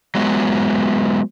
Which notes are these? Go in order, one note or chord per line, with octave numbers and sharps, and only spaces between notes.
F#3 G#3 B3